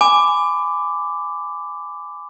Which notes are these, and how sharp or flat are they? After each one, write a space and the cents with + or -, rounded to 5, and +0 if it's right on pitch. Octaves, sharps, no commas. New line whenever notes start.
G#5 +0 B5 +30 D6 +0